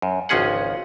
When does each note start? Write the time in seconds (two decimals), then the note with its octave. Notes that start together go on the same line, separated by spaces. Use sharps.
0.02 F#2
0.29 G#1 C#2 F3 C#4 G#4 F#5